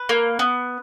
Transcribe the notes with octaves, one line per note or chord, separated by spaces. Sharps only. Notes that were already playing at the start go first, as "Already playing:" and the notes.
Already playing: B4
A#3
B3